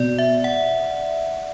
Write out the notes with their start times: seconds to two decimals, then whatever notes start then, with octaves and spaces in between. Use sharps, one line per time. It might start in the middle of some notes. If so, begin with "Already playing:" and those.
Already playing: B2 D5
0.19 E5
0.44 F#5